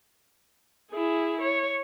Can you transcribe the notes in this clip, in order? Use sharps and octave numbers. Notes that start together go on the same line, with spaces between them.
E4 G#4
C#5